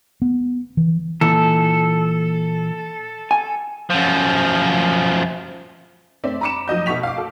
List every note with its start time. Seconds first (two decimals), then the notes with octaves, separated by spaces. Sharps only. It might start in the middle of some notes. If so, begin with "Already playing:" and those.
0.22 B3
0.77 E3
1.21 A#2 E3 A4
3.31 G#5
3.90 F#2 F3
6.24 A3 C4 D5 E5
6.41 A#5 B5 D6 C#7 E7
6.68 F3 F#3 D#5 G6
6.86 B2 A3 F#4 C#6 B6 F7
7.03 F5 D6
7.17 F#4 A4